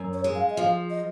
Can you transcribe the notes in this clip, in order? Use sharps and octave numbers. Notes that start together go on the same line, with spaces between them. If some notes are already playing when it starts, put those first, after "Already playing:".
Already playing: F#2
C#5
G#3
F5
D#5
F3 F5
D#5